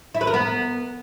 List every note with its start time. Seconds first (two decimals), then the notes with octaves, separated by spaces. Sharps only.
0.15 E4
0.21 B4
0.27 A#4
0.34 B3